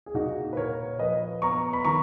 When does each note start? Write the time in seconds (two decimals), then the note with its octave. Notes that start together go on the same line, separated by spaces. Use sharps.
0.06 G#4
0.14 A#2 D#4 F#4
0.53 B4
0.57 A#2 A#4 C#5
0.99 F3 B4 D#5
1.42 B3 A#5 C#6
1.73 B5
1.85 D#3 A#5 C#6